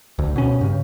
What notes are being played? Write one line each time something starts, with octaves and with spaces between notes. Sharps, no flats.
D2
B2 C#4
G2 C#3